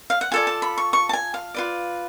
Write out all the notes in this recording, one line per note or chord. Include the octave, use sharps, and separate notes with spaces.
F5
F#5
F4 A4 D5 G#5
A5
B5
C#6
C#6
A5
G#5
F5
F4 B4 D5